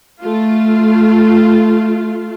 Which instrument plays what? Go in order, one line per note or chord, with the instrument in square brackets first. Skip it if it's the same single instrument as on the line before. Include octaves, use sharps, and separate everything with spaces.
[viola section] A3 F4